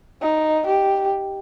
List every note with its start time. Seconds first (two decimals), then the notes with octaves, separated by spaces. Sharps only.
0.22 D#4
0.67 G4